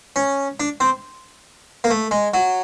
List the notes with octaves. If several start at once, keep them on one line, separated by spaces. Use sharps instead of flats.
C#4
D4
C4
A#3
A3
G#3
F#3